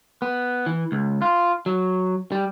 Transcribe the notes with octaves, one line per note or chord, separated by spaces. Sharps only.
B3
E3
C#2
F4
F#3
G3